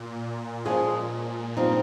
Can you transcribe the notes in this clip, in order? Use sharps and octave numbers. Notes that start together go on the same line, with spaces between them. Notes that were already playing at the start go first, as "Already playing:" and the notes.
Already playing: A#2
A#2 F3 G#3 C#4 G#4
G2 F3 C4 D#4